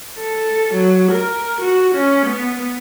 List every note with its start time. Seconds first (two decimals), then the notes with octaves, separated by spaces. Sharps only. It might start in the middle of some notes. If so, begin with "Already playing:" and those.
0.18 A4
0.74 F#3
1.11 A#4
1.61 F#4
1.95 C#4
2.26 B3